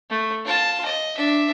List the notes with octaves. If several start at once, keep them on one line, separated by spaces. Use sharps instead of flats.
A3
F4 A5
D#5
D4 E5